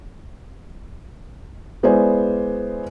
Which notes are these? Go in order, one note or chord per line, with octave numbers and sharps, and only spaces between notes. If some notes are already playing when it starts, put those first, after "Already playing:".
G#3 B3 E4 C5 D5 G#5